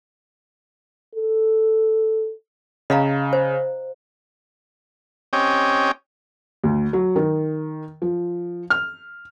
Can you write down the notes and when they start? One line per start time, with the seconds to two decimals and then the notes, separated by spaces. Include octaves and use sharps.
1.15 A4
2.90 C#3 D#5 F5 A#5
3.33 C5
5.33 C4 C#4 G4 C#5 D#5 G5
6.64 D2
6.93 F#3
7.16 D#3
8.02 F3
8.70 F6